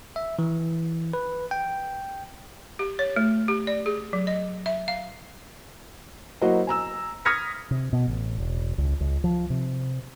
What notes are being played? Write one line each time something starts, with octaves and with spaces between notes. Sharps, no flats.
E5
E3
B4
G5
G4
C#5
A3
G4
D5
G#4
F#3
D#5
E5
F5
F#3 A#3 E4 F#4 C5 D#5
G#5 A#5 E6
D#6 F6 G#6 A#6 B6 C#7
C3
B2
A1
E1
C#2
C#2
F3
C3